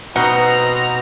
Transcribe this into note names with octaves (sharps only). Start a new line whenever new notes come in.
B2 C4 D#4 F#4 B4 F#5 A#5 C6